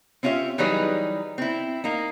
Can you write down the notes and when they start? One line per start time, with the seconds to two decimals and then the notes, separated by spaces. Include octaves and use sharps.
0.23 C4 C#4 F4 G4 E5
0.58 E3 F#3 G3 D#4 G#4 B4
1.38 C4 E4
1.84 A#3 D#4